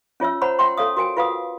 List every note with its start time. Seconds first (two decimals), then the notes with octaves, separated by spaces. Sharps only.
0.20 C#4 F4 C#5 E5 E6
0.42 C5 C#5 F#5 A#5 B5
0.59 E5 F#5 G5 C6
0.77 A4 C#5 F5 D#6
0.97 F#4 A#4 G5 G#5
1.17 F4 B4 F5 F#5 D#6